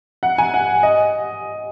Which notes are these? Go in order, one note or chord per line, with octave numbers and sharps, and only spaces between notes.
F#5
G#5
F#5
D#5